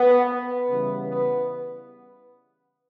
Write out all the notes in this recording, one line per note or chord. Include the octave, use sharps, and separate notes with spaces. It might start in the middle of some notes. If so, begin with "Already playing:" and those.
Already playing: B3
B3
C#3 E3 G3
B3